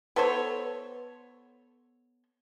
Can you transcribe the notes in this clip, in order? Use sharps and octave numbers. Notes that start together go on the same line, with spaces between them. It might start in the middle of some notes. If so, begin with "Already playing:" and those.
B3 A4 C5 C#5